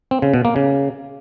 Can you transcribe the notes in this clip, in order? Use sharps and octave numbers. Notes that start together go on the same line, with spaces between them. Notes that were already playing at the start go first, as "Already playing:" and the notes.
C4
C#3
B2
A#3
C#3